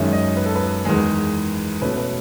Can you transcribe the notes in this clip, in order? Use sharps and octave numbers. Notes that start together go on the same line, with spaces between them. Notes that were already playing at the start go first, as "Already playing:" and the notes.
Already playing: F#2 D#3 G#3 C#4 E5
D#5
B4
A4
B4
E2 D#3 G#3
B2 A3 C#4 B4
B4